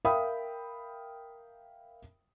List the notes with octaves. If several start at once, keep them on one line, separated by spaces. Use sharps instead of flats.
A#4 E5 F5 G5 B5 D#6